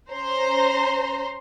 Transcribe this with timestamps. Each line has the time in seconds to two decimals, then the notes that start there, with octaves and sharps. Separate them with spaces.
0.12 C#4 C5 A#5 C6